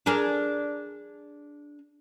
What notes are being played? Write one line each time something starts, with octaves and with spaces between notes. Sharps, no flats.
D4 G#4 A#4